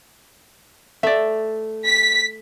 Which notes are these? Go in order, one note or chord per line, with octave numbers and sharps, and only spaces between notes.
A3 D5 E5
B6